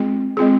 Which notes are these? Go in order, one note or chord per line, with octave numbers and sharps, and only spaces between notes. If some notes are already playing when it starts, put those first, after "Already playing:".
Already playing: G#3 C4 F4 G#4
G#3 C4 F4 G#4